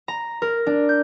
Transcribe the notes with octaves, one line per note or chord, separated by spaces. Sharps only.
A#5
A#4
D4
G6